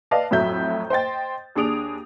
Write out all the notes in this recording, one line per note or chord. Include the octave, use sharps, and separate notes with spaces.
B4 D5 D#5 F5 A5
F2 A2 F#3 E5 G6
C5 D#5 G5 A6
D#2 D4 G#4 D#6 D7 F7